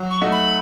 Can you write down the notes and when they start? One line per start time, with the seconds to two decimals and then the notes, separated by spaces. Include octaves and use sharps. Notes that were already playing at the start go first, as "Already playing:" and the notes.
Already playing: F#3
0.11 C#6
0.21 A3 D#4 F#4
0.32 B5